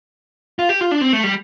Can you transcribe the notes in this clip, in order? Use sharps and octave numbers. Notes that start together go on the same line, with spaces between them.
F4
G4
F4
D4
C4
A3
G3